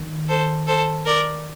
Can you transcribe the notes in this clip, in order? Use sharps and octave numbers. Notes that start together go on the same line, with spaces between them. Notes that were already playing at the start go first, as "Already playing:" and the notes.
Already playing: D#3
A4 C5
A4 C5
A#4 D5